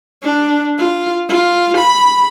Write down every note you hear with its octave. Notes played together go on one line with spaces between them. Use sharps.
D4
F4
F4
B5